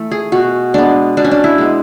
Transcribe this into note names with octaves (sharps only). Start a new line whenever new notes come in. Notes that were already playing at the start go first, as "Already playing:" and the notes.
Already playing: E3 A3
G#4
B2 F#4
G#3 B3 D4
B2 D4
C#4
D4
E4
G#3 B3